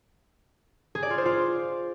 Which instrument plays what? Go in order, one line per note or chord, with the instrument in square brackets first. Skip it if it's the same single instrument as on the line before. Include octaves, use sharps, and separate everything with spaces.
[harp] G#4
D5
F4
C5
F4